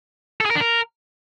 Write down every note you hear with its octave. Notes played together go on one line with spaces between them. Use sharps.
A4
G#4
A#4
D4
A#4